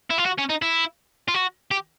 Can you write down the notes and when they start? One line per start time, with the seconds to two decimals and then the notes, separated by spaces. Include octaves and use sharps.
0.10 E4
0.18 F4
0.25 F#4
0.38 C#4
0.49 D#4
0.62 E4
1.28 F4
1.34 F#4
1.71 G4